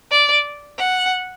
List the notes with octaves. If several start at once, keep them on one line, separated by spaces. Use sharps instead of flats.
D5
F#5